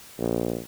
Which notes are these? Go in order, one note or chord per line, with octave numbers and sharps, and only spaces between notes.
A#1